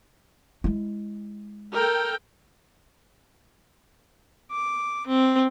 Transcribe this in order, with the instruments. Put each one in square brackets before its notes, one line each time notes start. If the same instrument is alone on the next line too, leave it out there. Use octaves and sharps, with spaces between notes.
[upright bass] G#3 E4
[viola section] A4 A#4 G5
[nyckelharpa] D6
C4